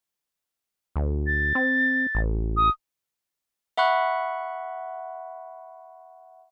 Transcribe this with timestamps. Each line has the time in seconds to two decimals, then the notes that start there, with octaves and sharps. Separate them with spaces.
0.96 D2
1.27 A6
1.55 C4
2.15 A1
2.57 D#6
3.77 E5 F#5 B5 C#6 F#6